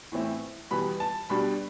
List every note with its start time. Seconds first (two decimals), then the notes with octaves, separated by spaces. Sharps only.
0.12 A2 E3 A3 C4 E4
0.71 E2 B2 G3 B3 B5
1.00 A5
1.29 B2 G3 D4 B5